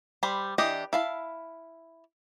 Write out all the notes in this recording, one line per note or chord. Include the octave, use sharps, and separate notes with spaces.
G3 C5 B5
E3 D4 G4 D#5
E4 F5 A5